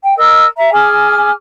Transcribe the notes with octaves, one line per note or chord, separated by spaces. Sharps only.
G5
A#4 D#5 E6
E5 A#5
G#4 G#5 D6 F6